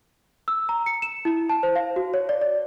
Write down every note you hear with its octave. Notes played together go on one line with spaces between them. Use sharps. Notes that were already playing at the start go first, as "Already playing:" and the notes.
E6
A#5
C#7
E7
E4
A5
C5
F5
F#4
C#5
D5
D5